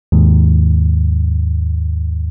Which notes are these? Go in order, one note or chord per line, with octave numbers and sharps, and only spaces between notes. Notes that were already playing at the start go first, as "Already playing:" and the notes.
D#2 G#2